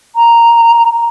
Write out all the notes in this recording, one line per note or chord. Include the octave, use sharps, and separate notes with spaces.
A#5